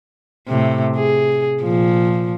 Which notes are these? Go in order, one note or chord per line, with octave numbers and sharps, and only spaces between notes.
A2 C3
G#4
A#2 F3